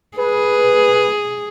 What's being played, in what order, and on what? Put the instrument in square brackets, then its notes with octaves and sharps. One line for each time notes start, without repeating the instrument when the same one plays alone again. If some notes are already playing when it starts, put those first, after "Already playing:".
[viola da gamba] G#4 [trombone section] B4